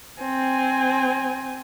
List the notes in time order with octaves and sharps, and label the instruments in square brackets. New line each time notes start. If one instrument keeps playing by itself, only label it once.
[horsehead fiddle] C4 G#5